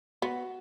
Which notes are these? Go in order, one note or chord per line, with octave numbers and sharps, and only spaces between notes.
B3 F#4